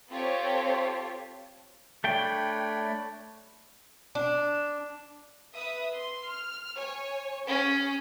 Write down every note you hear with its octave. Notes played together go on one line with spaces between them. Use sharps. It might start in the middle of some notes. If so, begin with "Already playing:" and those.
C4 F4 G4 A4 C5 C#5
A3 D4 C#5 G5 B5
D4
B4 E5 D#6
C6
F6
C#5 G#5
C#4 G#4